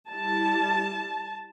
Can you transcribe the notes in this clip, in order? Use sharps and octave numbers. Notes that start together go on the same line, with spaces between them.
G3 E4 A5